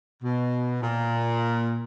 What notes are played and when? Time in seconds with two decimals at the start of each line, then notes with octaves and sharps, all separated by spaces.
0.23 B2
0.82 A#2